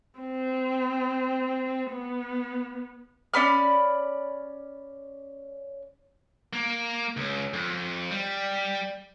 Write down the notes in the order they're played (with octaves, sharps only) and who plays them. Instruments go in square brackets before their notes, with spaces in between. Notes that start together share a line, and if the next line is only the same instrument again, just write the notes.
[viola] C4
B3
[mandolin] C#4 D5 B5 F6
[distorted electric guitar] A#3
C#2
F2
G3